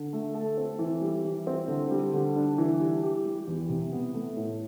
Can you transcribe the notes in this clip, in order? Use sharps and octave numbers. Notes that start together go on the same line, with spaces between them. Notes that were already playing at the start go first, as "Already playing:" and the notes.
Already playing: D3
A3
A4
C4
E3
G3
E3
C4
D3
G3
D3
D4
E3
G3
G4
G3
E2
C3
B3
A3
A2